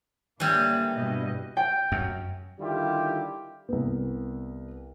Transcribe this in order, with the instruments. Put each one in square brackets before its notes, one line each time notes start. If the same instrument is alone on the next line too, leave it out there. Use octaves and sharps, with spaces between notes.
[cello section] D3 A#3 [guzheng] E3 G3
[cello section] G2 B2 D#5
[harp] G5
[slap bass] F#2
[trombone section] D3 D#3 G3 E4 F4 G4
[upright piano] C2 B3